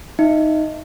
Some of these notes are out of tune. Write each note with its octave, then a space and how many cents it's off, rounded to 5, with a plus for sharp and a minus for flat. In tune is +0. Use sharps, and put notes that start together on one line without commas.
D#4 +0 E5 +20